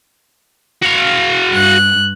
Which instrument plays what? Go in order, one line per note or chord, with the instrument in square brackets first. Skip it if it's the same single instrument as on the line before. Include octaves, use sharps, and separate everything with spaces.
[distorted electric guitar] F#4 F5
[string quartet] G2 F#6